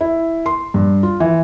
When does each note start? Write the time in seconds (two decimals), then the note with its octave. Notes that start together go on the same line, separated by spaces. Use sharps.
0.01 E4
0.46 C6
0.74 G2
1.03 F4
1.20 E3